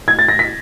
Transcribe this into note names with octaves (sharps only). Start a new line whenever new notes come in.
G#6
A6
A#6
B6